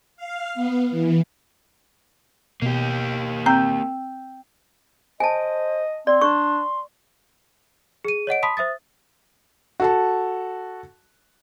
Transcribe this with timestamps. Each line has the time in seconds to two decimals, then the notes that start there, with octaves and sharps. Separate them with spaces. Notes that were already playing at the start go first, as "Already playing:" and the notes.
0.16 F5
0.54 B3
0.90 E3
2.62 B2 A#3 G4
3.46 C4 G5 A#5 E6 G6
5.20 C5 D#5 G#5 A5
6.07 C4 D5 C6
6.21 D4 C#6
8.05 G#4 D#7
8.27 C#5 D#5 F#5 D7
8.43 A5 B5 C6 D#6 B6
8.57 C5 E5 D#6 A6
9.80 F#4 A4 A5